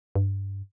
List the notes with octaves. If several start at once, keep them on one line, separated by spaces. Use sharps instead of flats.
G2